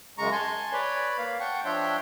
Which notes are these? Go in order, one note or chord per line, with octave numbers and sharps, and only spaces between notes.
F#2 C#3 G#3 A#5 C#6
G#5 A5 C6
B4 C#5 D5 B5
A#3 F5
F#5 G5 A5 C#6
F3 D4 C#5 E5 G5 C6